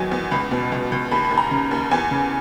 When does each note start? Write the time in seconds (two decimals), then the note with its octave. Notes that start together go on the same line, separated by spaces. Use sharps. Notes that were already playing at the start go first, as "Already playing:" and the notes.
Already playing: E2 D#3 F#3 G#5
0.11 E2
0.31 C#2 B5
0.51 B2
0.72 C#2
0.92 C#2
1.11 D#2 B5
1.25 B5
1.31 D#2
1.37 A#5
1.51 C#3
1.71 D#2
1.91 E2 G#5
2.11 C#3